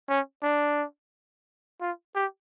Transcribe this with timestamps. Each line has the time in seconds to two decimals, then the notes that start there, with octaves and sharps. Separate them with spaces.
0.09 C#4
0.42 D4
1.81 F4
2.15 G4